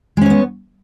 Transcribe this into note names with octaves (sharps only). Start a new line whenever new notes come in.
G#3 B3 C#4 C#5